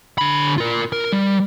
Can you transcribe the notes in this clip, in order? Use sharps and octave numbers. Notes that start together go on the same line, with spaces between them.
D3 B5
F4 A#4
A#4
G3